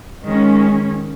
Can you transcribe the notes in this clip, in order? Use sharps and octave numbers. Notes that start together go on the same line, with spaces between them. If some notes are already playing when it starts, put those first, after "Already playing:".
D#3 G#3 C#4